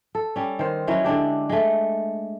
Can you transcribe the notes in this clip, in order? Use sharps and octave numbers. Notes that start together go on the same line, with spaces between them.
A4
G3 C#4
D#3 C5
F#3 C#4 D#4 E4
D3 G#3 D4 G4
G#3 A3